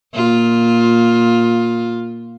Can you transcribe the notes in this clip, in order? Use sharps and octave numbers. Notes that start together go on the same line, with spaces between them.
A#2 F4